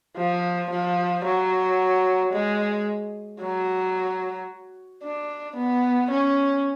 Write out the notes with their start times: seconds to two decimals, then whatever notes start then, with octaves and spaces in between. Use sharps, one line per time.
0.17 F3
0.71 F3
1.25 F#3
2.33 G#3
3.41 F#3
5.03 D4
5.56 B3
6.11 C#4